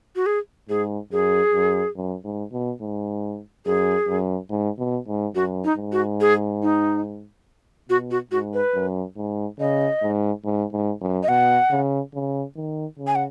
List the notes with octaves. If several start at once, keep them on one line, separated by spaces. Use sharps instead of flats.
F#4
G#4
G#2 G#4
F#2 G#4
F#2
F#2
G#2
B2
G#2
F#2 G#4
F#2
G#2
B2
G#2
F#2 F#4
D#4
G#2
F#4
G#4
D#4
B2 F#4
F#4
G#2 F#4
B4
F#2
G#2
C#3 D#5
G#2
G#2
G#2
F#2
D#5
B2 F#5
C#3
C#3
D#3
C#3
G#5
F#5